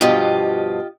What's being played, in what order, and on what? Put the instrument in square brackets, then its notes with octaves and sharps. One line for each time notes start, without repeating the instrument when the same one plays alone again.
[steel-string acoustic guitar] G2 B2 F3 [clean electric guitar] F4 G4 D#5